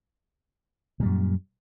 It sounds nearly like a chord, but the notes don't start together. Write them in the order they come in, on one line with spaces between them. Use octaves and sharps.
A#2 G3 F#2